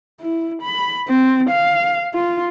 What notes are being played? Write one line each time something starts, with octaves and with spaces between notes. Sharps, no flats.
E4
B5
C4
F5
F4